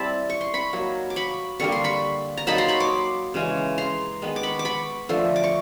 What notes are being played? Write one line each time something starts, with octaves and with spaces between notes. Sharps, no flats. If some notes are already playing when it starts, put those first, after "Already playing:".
Already playing: G3 C4 E4 A5 B5
C#6
C6
B5 C#6
F#3 A#3 D#4
D6
B5 C#6
D3 G3 A#3 C#6
C6
B5 C#6
A#5
F#3 A#3 D#4 A5 B5
A#5 C6
B5 C#6
C6 D6
C#3 E3 G#3 C#4
A#5 C6
D#3 G#3 B3
D6
B5 C#6
D6
B5 C#6
D3 F3 A3
D6
C#6